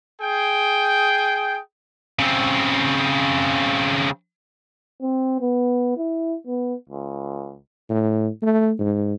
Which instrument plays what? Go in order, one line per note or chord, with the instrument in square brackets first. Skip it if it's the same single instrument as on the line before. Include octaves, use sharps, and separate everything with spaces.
[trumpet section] G#4 G5
[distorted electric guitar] C#3 C4
[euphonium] C4
B3
E4
B3
C#2
[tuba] A2
A3
G#2